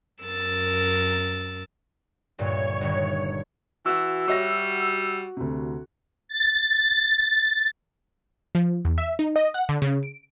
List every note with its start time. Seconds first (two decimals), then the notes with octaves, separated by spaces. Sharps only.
0.23 F#2 A#4 E6 A6
2.38 D2 G2 A#2 C#5
2.81 G1 D#3
3.86 E3 F#4 F#5 E6
4.28 G3 F#4 C#5 E5 A#6
5.37 D2 C3
6.28 A6
8.55 F3
8.85 E2
8.98 E5
9.19 D#4
9.36 D#5
9.54 F#5
9.69 D3
9.82 C#3
10.03 D7